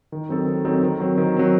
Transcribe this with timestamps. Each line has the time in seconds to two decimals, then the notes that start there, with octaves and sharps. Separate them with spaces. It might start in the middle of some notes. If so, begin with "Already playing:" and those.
0.12 D#3
0.29 F#3 C4 D#4 A4
0.47 D#3
0.65 F#3 C4 D#4 A4
0.83 D#3
1.00 F#3 C4
1.18 D#3
1.37 F#3 C4